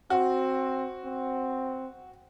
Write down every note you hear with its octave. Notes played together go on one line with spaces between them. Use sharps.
C4 F#4
C4